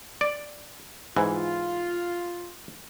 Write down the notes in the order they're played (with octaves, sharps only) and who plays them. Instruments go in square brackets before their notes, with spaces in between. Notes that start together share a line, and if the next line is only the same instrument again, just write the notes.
[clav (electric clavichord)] D5
[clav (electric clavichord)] G#2 E3 [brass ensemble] F4